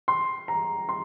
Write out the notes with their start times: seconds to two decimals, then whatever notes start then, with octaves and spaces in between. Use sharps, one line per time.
0.08 C6
0.48 A#5
0.89 C6